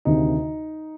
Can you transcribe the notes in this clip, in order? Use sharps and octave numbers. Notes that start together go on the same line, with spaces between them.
D2 C3 D#3 D#4